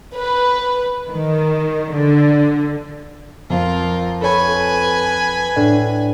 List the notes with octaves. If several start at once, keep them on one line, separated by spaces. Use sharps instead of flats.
B4
D#3
D3
F2 F4 A#4
A4 B4 C#5 G#5 B5
A2 D4